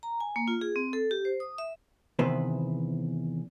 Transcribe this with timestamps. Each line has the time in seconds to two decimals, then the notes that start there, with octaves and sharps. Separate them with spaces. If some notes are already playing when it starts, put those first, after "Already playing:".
0.03 A#5
0.20 G#5
0.36 A#3
0.48 F4
0.61 G#4
0.76 C4
0.93 A4
1.11 G4
1.25 C5
1.40 D#6
1.58 E5
2.19 E2 C3 D#3 B3 B4 C5